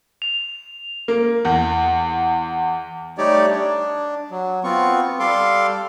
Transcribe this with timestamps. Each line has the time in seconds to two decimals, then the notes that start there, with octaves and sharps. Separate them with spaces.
0.22 F7
1.08 A#3
1.45 E2
3.18 G3 A3 D#4 G4 C#5 D5
3.51 D4
4.31 F#3
4.64 B3 C4 F4 C#6
5.20 G3 A4 F5 C6 D6